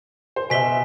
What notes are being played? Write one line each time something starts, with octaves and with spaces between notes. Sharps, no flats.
C5
B2 E5 G#5 B6 G7